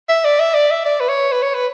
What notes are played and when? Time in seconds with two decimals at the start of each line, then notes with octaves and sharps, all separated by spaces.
0.09 E5
0.25 D5
0.39 E5
0.54 D5
0.70 E5
0.85 D5
1.00 B4
1.08 C#5
1.32 B4
1.42 C#5
1.54 B4